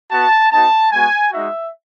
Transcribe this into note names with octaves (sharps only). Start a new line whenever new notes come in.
B3 F#4 A5
B3 D#4 F#4 A5
G#3 B3 F#4 G#5
G#3 D#4 F#4 E5